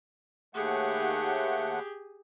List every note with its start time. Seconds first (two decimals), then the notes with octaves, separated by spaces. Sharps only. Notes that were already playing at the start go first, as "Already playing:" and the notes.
0.55 D#2 A3 G4 G#4 F#5